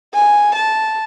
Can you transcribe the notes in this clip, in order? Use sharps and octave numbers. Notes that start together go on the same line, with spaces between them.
G#5
A5